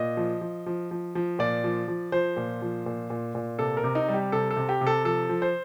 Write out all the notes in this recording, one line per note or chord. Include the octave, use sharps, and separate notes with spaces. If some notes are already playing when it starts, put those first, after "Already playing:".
Already playing: A#2 D#5
F3
F3
F3
F3
F3
A#2 D5
F3
F3
F3 C5
A#2
F3
A#2
A#2
A#2
C3 A4
A#4
C3
D#4
G3
G4
C3 A4
A4
C3
G4
C3
A4
F3 A4
F3
C5